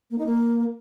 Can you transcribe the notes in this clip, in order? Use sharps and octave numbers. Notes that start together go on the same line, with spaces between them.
A#3
D#4
A#3